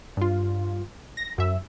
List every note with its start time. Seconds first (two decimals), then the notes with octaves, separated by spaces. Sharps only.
0.17 G2 F4
1.17 A#6
1.38 F#2 E5